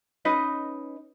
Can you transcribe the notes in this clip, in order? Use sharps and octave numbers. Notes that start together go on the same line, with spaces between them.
C#4 D#4 B4 D#5